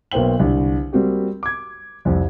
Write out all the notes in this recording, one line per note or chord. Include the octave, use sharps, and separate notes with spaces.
B1 A#3 B3 C5 G5 F#7
C2 D3
G3 A#3 C4 F#4 G4
D6 G#6
C2 F2